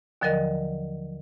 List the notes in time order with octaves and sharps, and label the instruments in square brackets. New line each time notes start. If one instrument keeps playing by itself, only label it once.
[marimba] D#2 D3 F3 F#3 A#4 D#5